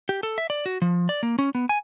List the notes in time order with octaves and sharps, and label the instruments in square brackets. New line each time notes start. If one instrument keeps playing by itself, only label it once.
[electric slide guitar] G4
A4
E5
D5
F#4
F3
D5
A#3
C#4
B3
G#5